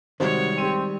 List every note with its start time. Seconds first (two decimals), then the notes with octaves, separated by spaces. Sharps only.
0.20 C3 D#3 G3 G#3 F#4 C5 C#5
0.58 C4 G4 D#7